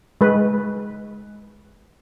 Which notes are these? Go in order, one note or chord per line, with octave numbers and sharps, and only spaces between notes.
G#3 B4